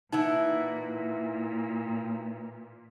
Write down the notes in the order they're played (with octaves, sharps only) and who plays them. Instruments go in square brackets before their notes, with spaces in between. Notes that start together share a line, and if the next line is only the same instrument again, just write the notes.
[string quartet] A#2 [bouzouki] E3 E4 F#5 [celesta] D#4